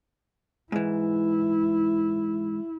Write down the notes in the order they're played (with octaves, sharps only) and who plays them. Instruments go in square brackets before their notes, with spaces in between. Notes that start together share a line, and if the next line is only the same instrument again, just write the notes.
[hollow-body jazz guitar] G#2 E3 [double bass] E4